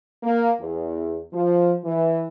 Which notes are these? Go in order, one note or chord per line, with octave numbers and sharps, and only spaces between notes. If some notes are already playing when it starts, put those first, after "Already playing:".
A#3
E2
F3
E3